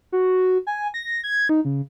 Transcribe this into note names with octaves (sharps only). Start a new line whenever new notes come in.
F#4
G#5
A#6
G#6
D#4
C#3